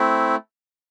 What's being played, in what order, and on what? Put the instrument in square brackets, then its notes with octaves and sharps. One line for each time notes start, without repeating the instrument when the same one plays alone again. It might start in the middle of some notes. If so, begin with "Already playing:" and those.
Already playing: [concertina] A3 C4 E4